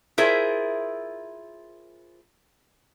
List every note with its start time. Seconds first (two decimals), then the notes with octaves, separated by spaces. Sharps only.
0.18 E4 F4 G#4 A#4 C5 E5